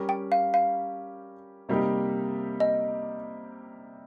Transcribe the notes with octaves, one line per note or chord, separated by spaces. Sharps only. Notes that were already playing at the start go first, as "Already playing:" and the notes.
Already playing: G3 C#4 G4 A#4
G5
F5
F5
C3 G3 A#3 D#4 G4
D#5